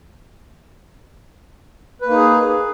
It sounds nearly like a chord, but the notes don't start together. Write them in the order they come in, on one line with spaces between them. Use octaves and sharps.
B4 A#3 D#4 G#4